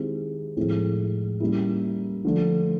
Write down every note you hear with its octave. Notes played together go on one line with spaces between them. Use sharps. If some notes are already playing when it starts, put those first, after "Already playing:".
Already playing: D#3 G#3 C4 E4 G4
A2 F3 G#3 C4 E4
G3 A#3 C#4 E4
D3 F3 A3 D4